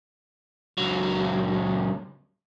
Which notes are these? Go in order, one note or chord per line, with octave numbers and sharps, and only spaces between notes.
C#2 F#3